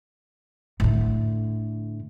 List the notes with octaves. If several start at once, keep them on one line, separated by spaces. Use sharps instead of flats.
A2 D3